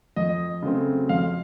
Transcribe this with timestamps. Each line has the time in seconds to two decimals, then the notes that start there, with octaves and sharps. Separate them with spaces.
0.16 F2 D#5
0.62 C#3 F#3 A3 C4
1.09 F2 F5